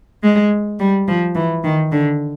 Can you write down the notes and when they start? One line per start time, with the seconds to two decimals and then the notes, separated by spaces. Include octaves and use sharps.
0.23 G#3
0.79 G3
1.07 F3
1.35 E3
1.64 D#3
1.92 D3